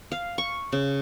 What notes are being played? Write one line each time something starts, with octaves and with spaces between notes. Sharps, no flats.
F5
C#6
C#3